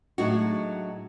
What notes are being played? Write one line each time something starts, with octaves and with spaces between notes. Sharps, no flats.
A2 F#3 G#3 D4 D#4 F#4